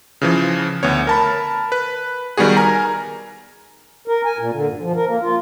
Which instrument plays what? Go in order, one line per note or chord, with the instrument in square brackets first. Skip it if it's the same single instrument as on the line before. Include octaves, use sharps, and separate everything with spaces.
[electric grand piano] C#3 E3 F3
D2 B3 C#5
A#4 A5 B5
B4
D#3 G3 B3 F#4 G#4
A#4 G#5 A#5
[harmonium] A#4
G#5
A#2
D3
G2
F3
A#4
A#3
F4